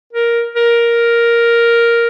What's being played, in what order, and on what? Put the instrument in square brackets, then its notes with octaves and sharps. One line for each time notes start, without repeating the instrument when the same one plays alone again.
[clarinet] A#4
A#4